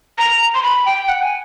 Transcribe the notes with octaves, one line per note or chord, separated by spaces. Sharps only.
A#5
C6
B5
G5
F#5
G#5